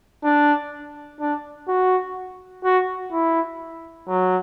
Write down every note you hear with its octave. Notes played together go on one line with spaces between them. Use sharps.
D4
D4
F#4
F#4
E4
F#3